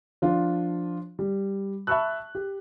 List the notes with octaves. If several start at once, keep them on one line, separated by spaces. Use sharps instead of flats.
F3 D4 F4
G3
E5 A5 B5 C#6 E6 F#6
G4